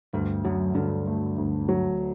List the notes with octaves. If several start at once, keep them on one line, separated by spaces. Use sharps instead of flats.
D2 G2
F#2 F#3
G2 D3
A3
D2
F#3